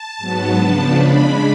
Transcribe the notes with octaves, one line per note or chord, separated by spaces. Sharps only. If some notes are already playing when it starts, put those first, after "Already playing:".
Already playing: A5
G#2 F#3 B3
C#3 F3 B3 D4
C#3 G#3 D4 B5